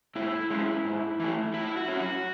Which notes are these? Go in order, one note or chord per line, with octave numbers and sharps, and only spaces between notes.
G#2 E4
G#3 C#4
G#2
E3 A3
A2 E4
F#4
F#3 C#4
F#4